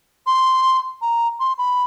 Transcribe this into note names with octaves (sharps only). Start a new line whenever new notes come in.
C6
A#5
C6
B5